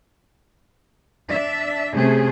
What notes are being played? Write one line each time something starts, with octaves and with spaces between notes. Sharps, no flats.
D4 E5
C3 A3 C#4 G#4